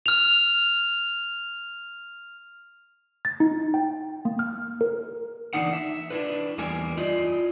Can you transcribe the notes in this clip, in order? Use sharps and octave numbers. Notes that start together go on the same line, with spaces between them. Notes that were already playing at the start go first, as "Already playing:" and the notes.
F6 F7
A6
D#4
G5
A#3
F6
A#4
E3 G#3 A#3 D4 D#4 F#5
E5
D4 E4 B4
E2 G3 A#3 G#5
E4 F4 D5 D#5